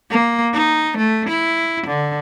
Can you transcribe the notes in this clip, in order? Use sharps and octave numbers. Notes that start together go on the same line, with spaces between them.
A#3
D#4
A3
E4
D3